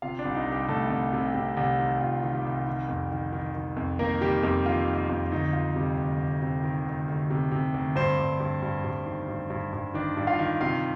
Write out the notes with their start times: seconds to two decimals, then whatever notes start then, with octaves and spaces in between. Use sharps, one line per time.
0.02 C3 F4 F5
0.19 D4 D5
0.25 C2
0.35 D#4
0.46 C2
0.52 G3 G4
0.68 C2 A3 A4
0.90 C2
1.13 C3
1.34 C3
1.57 C2
1.79 D#3
2.00 C2 F4
2.22 D#3
2.34 G3 G4
2.45 C2
2.67 D#3
2.89 F2
3.11 D#3
3.33 D#3
3.55 D#3
3.77 F2
3.99 D#3 A#3 A#4
4.21 D#3 G3 G4
4.43 F2 G3 G4
4.66 D#3 F4
4.88 D#3
4.98 F4
5.09 F2
5.32 D2 D#4
5.53 D2 F4
5.76 C3 G3 G4
5.98 D2
6.20 D2
6.42 C3
6.64 D#3
6.86 D2
7.08 D2
7.30 C3
7.51 C3
7.74 D2
7.96 G2 C4 C5
8.19 G2
8.40 G2
8.63 G2
8.84 G2
9.06 D#3
9.28 G2
9.50 G2
9.73 G2
9.94 D#3 D4 D5
10.17 G2
10.27 F4 F5
10.39 D#3
10.61 C3 F4 F5